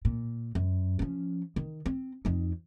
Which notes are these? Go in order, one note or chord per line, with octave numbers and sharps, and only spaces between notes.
A#2
F#2
F3 C#4
D#3
C4
F2 D#4